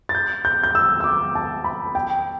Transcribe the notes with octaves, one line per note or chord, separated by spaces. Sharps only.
A6
G6
G6
G6
E6
E6
D6
A5
B5
G5